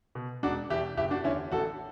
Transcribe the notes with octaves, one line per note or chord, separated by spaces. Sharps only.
B2
E1 D4 F#4
E2 B2 E4 G4
F#1 E4 G4
D4 F#4
E2 D3 C#4 E4
A1 F#4 A4